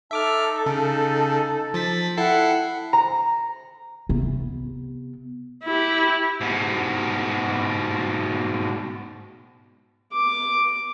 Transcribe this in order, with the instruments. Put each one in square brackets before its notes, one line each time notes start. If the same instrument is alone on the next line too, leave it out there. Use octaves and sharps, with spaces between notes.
[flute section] D#4 A4 A5 [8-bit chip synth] E5 D6 F6
[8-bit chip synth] C#3
F3 A6 B6
[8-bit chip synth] E4 A4 C7 [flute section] F#5 G5
[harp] A#5
[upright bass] C3 B3
[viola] E4 G4
[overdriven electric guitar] G#2 B2
[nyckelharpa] D6